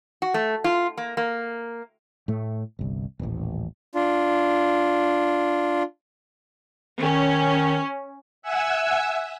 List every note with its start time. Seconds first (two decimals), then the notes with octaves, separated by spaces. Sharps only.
0.22 F#4
0.34 A3
0.64 F4
0.97 A#3
1.17 A#3
2.28 A2 A3
2.79 G1 C2
3.19 D#1 A1
3.95 D4 F4
7.01 D#3 C#4
8.42 E5 F#5 G#5 E6